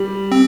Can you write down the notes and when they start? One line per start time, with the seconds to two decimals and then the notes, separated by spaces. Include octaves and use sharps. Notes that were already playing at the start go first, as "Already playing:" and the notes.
Already playing: G3
0.32 C4